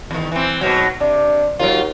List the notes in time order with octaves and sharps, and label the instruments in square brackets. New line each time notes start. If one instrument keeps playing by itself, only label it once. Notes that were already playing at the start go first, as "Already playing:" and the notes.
[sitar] E2 D#3
E3 C4
G#2 B2 F#3
[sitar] C3 [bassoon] D4
[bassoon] D#2 [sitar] F#3 F4